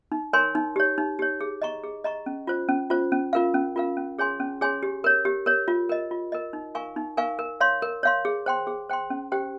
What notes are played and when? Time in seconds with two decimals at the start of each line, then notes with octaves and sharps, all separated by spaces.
0.12 D#4
0.33 A#4 C#5 G#5 C6
0.55 D#4
0.76 G4 C#5
0.98 D#4
1.19 G4 C#5
1.41 G#4
1.62 D#5 A#5 C#6
1.84 G#4
2.04 D#5 A#5 C#6
2.26 C#4
2.47 F4 C5
2.69 C#4
2.90 F4 C5
3.12 C#4
3.33 F4 A#4 F5
3.54 C#4
3.76 F4 A#4 F5
3.97 C#4
4.19 G#4 C#5 G#5 C6
4.40 C#4
4.61 G#4 C#5 G#5 C6
4.83 G4
5.04 A#4 C#5
5.25 G4
5.46 A#4 C#5
5.68 F4
5.89 A#4 D#5
6.11 F4
6.32 A#4 D#5
6.53 D#4
6.75 A#4 F5 G#5 C#6
6.96 D#4
7.17 A#4 F5 G#5 C#6
7.39 A#4
7.61 C#5 F5 C6
7.82 A#4
8.03 C#5 F5 C6
8.25 G#4
8.46 C5 G5 C6
8.67 G#4
8.89 C5 G5 C6
9.10 C#4
9.32 G4 C5 G5